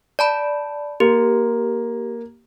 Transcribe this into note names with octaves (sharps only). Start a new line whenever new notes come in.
D5 A5 B5
A#3 G4